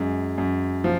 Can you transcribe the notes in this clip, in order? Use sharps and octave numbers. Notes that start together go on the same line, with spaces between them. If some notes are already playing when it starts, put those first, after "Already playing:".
Already playing: F#2 G#3
F#2
F3